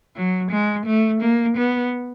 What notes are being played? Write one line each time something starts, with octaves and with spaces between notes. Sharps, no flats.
F#3
G#3
A3
A#3
B3